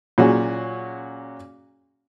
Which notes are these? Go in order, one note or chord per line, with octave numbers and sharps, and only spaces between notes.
A#2 F#3 C#4 F#4 G#4